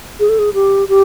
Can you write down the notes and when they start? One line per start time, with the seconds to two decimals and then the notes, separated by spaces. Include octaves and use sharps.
0.20 G#4
0.29 A4
0.39 G#4
0.54 G4
0.89 G4